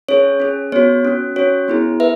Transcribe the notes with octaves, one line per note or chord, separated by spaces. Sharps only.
C#4 G#4 C#5
C#4 G#4
B3 F#4 C#5
C#4 F#4
C#4 F#4 C#5
B3 E4 G#4
B4 E5